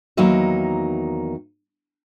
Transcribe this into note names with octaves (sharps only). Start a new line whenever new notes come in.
E2 D#3 F#3 A#3 D#4 E5